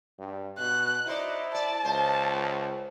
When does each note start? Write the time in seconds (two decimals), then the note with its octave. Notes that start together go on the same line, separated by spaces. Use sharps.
0.19 G2
0.59 B2 F#6
1.07 D#4 E4 F#4 C5 D5
1.55 D5 A5
1.84 C#2 C5